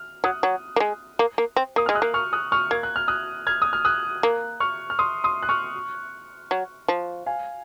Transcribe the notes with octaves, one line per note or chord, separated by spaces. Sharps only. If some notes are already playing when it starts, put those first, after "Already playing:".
Already playing: F6
F#3 D#6 F#6
F#3
A#3
G#3
A#3
A#3
C4
A#3 D#6
G#3 F6
D#6 F#6
A#3
C#6 F6
D#6 F#6
C#6 F6
A#3 G#6
F#6
F6
D#6 F#6
F6 G#6
D#6
F6
D#6 F#6
A#3
C#6 F6
F6
C6 D#6
C6 D#6
F#6
C#6 F6
F#3
F3
F5 G#5